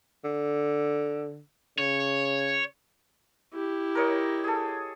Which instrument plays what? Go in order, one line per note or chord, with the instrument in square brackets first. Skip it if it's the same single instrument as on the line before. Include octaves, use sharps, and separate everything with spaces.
[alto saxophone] D3
[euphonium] C#3 [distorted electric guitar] C#5
[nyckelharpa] E4 G4
[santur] A#4 C#5 D#5
G#4 A4